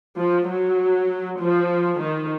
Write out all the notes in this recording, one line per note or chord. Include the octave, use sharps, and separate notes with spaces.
F3
F#3
F3
D#3